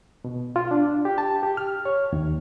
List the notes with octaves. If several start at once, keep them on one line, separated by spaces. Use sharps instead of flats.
B2
F4
D4
G4
A5
G4
F6
C#5
D#2